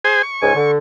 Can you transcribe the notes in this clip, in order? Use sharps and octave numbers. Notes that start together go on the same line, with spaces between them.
G#4 C5 G#5
C#6
C#2 G#2 G#5
D3